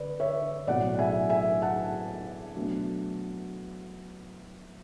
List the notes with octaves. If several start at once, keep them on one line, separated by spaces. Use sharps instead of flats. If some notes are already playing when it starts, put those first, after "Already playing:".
Already playing: D3 B4 D5
C#5 E5
B1 A2 F#3 A3 D5 F#5
F#5
E5 G#5
E5 G#5
F#5 A5
B2 F#3 A3 D4